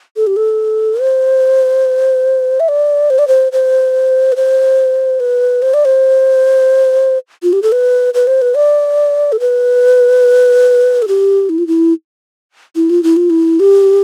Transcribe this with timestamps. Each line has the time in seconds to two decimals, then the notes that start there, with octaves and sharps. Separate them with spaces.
0.17 A4
0.27 G4
0.36 A4
1.00 C5
2.60 E5
2.69 D5
3.10 C5
3.19 D5
3.28 C5
3.52 C5
4.32 B4
4.36 C5
5.20 B4
5.62 C5
5.74 D5
5.85 C5
7.43 F4
7.53 G4
7.62 A4
7.72 B4
8.14 B4
8.27 C5
8.42 B4
8.56 D5
9.32 A4
9.40 B4
11.02 A4
11.08 G4
11.49 E4
11.58 F4
11.67 E4
12.76 E4
12.90 F4
13.03 E4
13.17 F4
13.30 E4
13.60 G4